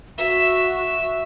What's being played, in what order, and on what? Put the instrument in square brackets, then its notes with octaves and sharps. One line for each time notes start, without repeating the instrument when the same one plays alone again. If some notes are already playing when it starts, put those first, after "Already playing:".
[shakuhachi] F#4 [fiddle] E5